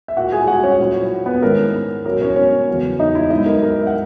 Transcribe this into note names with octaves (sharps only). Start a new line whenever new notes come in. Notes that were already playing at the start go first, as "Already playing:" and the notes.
E5
A#2 A#3 E4 F#4 F#5
G#4 G#5
F#4 F#5
C#4 C#5
A#2 F#3 C#4 E4
B3 B4
G#2 D#3 G#3 C#4 E4 A#4
B2 F#3 C#4 E4 A#4
C#4 C#5
C#4 C#5
E2 C#3 F#3 B3 E4
D#4 D#5
E4 E5
G#2 F#3 B3 D#4 E4 D#5
A#4
A#4
E5
F#5